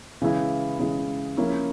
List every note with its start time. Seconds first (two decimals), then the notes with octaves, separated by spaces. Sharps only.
0.22 C#3 E3 G#3 E4
0.79 C#3 E3 G#3 E4
1.37 F3 A#3 C#4 E4